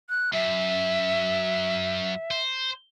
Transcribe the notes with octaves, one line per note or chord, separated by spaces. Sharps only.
F#6
F#2 E5
C5